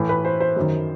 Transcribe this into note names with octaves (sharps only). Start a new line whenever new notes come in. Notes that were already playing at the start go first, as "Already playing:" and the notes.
Already playing: A2 E3
B4
C5
C5
F#2 D#3